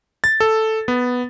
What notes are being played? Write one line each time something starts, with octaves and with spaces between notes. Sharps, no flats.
A6
A4
B3